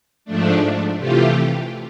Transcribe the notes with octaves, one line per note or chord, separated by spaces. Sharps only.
G#2 F3 A3 D4
C3 E3 A3 F4 G4